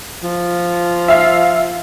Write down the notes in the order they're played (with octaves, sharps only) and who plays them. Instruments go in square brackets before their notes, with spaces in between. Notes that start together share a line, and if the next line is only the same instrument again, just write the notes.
[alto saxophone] F3
[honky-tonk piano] E5 F5